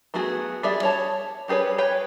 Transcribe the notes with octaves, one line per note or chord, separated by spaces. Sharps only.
F#3 A3 B3 F#4 G#4
G3 G#4 D5 E5
C#5 A5
G3 G4 G#4 B4 C#5
B4 C#5 G5